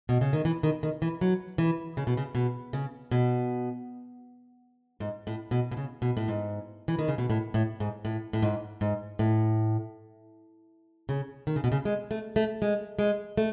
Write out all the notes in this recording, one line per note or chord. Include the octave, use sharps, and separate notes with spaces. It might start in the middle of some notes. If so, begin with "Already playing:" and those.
B2
C#3
D#3
E3
D#3
D#3
E3
F#3
E3
C#3
B2
C#3
B2
C#3
B2
G#2
A2
B2
B2
C#3
B2
A2
G#2
E3
D#3
C#3
B2
A2
A2
G#2
A2
A2
G#2
G#2
A2
C#3
D#3
C#3
B2
C#3
G#3
A3
A3
G#3
G#3
A3